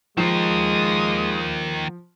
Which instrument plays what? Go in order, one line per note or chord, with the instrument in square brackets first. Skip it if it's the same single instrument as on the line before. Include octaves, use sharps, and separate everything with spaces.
[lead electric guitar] D#3 A#3 [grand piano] F3 C7 [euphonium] G#3 [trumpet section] C6 C#6 D#6